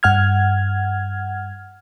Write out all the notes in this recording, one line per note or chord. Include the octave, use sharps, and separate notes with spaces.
G2 F#5 F6 G#6